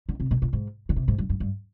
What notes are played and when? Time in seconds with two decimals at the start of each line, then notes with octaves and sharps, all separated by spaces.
0.09 D3
0.20 C3
0.31 A#2
0.42 A#2
0.53 G#2
0.89 D3
0.96 C3
1.08 G#2
1.18 G2
1.29 G2
1.40 G2